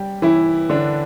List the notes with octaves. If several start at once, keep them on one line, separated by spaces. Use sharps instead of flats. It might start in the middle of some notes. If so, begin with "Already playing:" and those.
Already playing: G3 G4
E3 E4
D3 D4